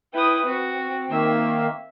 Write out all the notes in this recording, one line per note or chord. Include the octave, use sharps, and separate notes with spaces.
E4 B4 G5 D#6
C4 F#4
D#3 A#3 E5